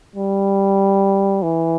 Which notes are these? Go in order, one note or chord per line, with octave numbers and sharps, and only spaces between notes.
G3
E3